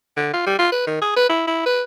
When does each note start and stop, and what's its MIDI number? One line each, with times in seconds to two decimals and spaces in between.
0.17 0.32 50
0.33 0.43 65
0.47 0.56 55
0.59 0.68 65
0.72 0.86 71
0.87 0.98 51
1.02 1.12 68
1.16 1.29 71
1.29 1.43 64
1.47 1.64 64
1.66 1.82 71